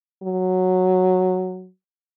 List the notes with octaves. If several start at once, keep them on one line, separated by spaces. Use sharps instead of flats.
F#3